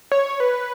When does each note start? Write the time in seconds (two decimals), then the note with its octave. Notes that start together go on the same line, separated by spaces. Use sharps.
0.12 C#5
0.40 B4